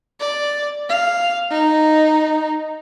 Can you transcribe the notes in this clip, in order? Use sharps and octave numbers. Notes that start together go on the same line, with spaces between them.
D5
F5
D#4